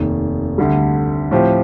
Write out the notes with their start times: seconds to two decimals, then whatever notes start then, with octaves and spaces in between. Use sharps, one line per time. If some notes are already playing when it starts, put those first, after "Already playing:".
Already playing: F1 D#2 D#3
0.58 D2 D3 G3
1.31 A2 F3 C4 G4